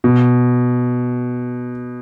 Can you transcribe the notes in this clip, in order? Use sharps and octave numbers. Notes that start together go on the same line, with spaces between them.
B2